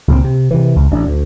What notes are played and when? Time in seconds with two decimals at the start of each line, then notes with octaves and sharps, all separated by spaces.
0.08 C#2 A#2 C4
0.24 C3
0.51 C3 E3
0.76 C#2
0.91 A1 D4
1.06 D2